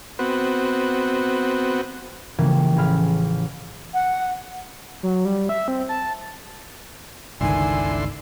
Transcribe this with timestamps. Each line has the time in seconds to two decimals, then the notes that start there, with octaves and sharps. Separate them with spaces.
0.19 B3 C4 F#4
2.39 C#3 E3 F3 G3 A#3
2.76 A1 G#4 B5 F6
3.94 F#5
5.03 F#3
5.25 G3
5.49 E5
5.68 C4
5.89 A5
7.41 G1 C#2 D3 D#3 E4 G#5 C6